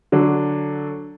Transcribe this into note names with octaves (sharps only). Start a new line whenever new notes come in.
D3 F#3 D4